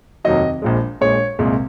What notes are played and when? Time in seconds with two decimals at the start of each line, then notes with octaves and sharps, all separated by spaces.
0.25 F1 D#2 D#3 F#3 D#5
0.62 A#1 A#2 F3 G#3
1.01 A#1 A#2 G#3 C#5
1.39 C2 A#2 G#3